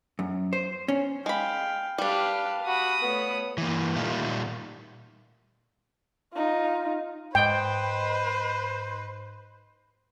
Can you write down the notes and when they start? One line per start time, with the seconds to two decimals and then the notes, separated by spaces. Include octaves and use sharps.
0.19 F#2
0.53 C5
0.88 C#4
1.26 G#3 F5 G5 B5
1.98 G3 D4 G4 B4 F5
2.66 F#4 B5 D#6
3.02 A3 B3 C#5
3.58 E3 A#3
3.96 A#2 D#3 G3 A3 F4
6.34 D#4 F4
7.35 G#2 B4 C5 D#5 G5